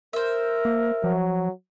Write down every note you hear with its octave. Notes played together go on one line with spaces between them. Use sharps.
A#4 C5 E5
A#3
F3 F#3